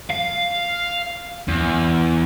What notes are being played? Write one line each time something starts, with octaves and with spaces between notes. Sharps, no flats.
F5
E2